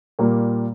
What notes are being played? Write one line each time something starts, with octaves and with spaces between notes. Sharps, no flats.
A#2 G3 A#3